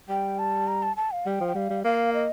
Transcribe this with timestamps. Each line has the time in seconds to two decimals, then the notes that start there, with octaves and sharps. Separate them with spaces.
0.09 G3 G5
0.39 A5
0.67 A#5
0.83 A5
0.97 A5
1.12 F5
1.26 G3 G5
1.41 F3
1.48 G5
1.55 G3 F5
1.70 G3
1.84 A#3 F5
2.14 D#5